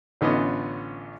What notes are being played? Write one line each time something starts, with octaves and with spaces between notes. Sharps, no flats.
A1 D3 B3 C#4 F4 D#5